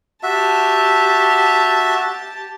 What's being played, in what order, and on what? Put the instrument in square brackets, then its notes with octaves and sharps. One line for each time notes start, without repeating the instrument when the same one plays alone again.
[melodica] F#4 E5 [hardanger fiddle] G4 A5